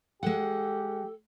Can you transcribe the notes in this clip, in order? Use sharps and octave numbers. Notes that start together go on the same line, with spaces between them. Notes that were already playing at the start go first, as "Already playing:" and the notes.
G#3 G4 A4 F#5